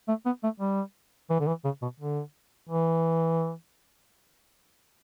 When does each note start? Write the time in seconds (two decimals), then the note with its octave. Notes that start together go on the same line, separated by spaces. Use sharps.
0.08 A3
0.26 B3
0.43 A3
0.60 G3
1.30 E3
1.40 D3
1.47 E3
1.64 C#3
1.82 B2
2.00 D3
2.69 E3